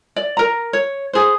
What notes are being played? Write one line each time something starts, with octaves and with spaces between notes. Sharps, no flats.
D5
A#4 A#5
C#5
G#4 C5